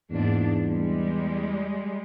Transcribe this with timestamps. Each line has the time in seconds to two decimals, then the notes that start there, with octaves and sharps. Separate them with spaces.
0.10 E2 G#2 A#3 D4
0.65 G3 G#3